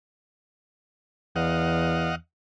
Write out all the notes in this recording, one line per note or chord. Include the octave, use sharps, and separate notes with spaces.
E2 D#5 F5 F#5